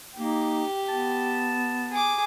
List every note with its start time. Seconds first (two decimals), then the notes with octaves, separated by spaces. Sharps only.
0.17 A#3 D#4 G4
0.89 B3 A5
1.91 G#4 D6